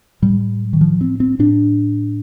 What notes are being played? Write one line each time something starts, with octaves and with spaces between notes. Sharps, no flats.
A2 G3
D#3
F3
C4
C4
A2 D4